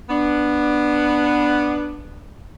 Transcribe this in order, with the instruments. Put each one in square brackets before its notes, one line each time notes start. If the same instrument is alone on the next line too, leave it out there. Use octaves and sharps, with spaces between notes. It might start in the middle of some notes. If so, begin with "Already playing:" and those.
[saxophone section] B3 D4